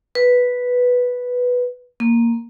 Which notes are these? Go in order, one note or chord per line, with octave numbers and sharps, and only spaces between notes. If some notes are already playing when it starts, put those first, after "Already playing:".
B4
A#3